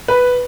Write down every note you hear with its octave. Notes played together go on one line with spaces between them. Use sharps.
B4